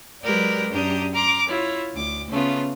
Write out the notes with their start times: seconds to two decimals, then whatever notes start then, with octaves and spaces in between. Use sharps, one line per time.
0.22 F#3 G#3 G4 A#4 B4 D5
0.70 F#2 D4 G4 A#5 D#6
1.12 A#5 C6 D6 F6
1.47 E4 F4 C#5
1.94 D2 D6
2.30 C#3 A3 B3 C#4 F4